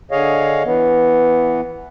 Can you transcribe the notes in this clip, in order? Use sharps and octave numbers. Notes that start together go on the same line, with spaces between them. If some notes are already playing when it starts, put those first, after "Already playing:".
D3 G#4 C#5 D#5 F5
E3 B3